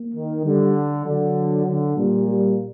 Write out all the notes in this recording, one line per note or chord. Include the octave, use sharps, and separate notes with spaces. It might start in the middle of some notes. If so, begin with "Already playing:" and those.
Already playing: A#3
D#3
D3 G3
D3 F#3
D3
A#2 G3
G3